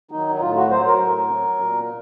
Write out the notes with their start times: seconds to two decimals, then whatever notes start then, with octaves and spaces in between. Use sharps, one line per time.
0.11 D#3 F#3 D#4
0.35 D#4
0.41 A2 F4
0.57 F#4
0.71 F#3 C5
0.86 A#4
1.00 A2
1.31 F#3
1.60 A#2